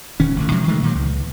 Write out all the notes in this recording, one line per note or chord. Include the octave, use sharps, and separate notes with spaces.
D#1 D#3 C#4
A1 D3
C3 F3 F#3 G#3
D#3 E3 G#3 A3
A#2 D#3 F#3
C#2